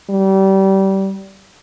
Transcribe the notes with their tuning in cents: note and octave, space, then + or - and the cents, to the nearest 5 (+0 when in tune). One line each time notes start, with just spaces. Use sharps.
G3 -25